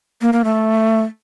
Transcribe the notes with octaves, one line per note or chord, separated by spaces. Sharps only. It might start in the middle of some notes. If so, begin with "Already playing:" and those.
A#3
A#3
A3